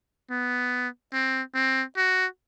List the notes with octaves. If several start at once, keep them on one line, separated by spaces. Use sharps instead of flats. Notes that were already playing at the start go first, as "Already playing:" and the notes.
B3
C4
C4
F#4